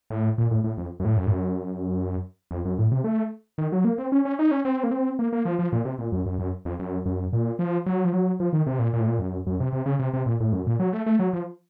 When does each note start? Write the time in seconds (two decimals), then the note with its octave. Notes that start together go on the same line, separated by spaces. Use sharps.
0.10 A2
0.38 A#2
0.51 A2
0.64 A2
0.78 F2
1.00 F#2
1.05 A2
1.17 F#2
1.27 A2
1.31 F#2
2.51 F2
2.65 F#2
2.78 A2
2.91 C3
3.04 A3
3.58 D#3
3.72 F#3
3.85 A#3
3.98 C4
4.12 C#4
4.25 C#4
4.39 D#4
4.51 C#4
4.65 C4
4.83 A#3
4.91 C4
5.19 A#3
5.33 A#3
5.45 F3
5.59 F3
5.72 A#2
5.85 C3
5.98 A#2
6.12 F#2
6.26 F#2
6.39 F#2
6.65 F2
6.79 F#2
7.06 F#2
7.33 A#2
7.59 F3
7.86 F#3
8.05 F3
8.13 F#3
8.40 F3
8.53 D#3
8.67 C3
8.79 A#2
8.93 A#2
9.00 A2
9.08 A#2
9.19 F#2
9.47 F#2
9.60 C3
9.73 C3
9.86 C#3
9.99 C3
10.13 C3
10.26 A#2
10.40 A2
10.53 F#2
10.67 A#2
10.80 F#3
10.93 A3
11.06 A3
11.19 F#3
11.33 F3